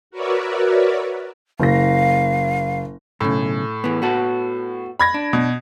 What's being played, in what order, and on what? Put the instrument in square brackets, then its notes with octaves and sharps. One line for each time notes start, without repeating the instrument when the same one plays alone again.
[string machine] F#4 A#4 B4 C#5 D5 E5
[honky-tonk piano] F#1 A#6 [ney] F5
[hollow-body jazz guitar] B1 C#3 [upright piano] A2
[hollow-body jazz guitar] E3 B3
B3 F#4 A4
[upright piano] B5 G#6 A#6
[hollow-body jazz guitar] D4
[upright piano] B2